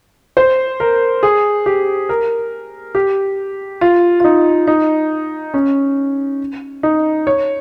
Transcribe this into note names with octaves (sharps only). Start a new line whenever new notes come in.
C5
A#4
G#4
G4
A#4
G4
F4
F4
D#4
D#4
C#4
D#4
C#5